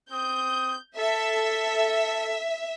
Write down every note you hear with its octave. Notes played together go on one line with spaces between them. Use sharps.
C4 D#6 G6
A4 E5